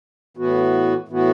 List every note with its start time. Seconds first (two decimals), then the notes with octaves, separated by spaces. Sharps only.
0.37 A2 E3 B3 F#4
1.08 A2 E3 B3 F#4